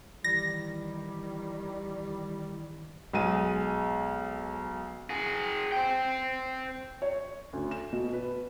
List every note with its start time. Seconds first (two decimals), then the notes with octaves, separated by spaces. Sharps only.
0.24 D#3 E3 G3 A#6
3.13 B1 G#3 D#7
5.09 F#4 G#4
5.72 C5 G5
7.02 C#5
7.53 D2
7.71 E7
7.93 B2
8.13 B4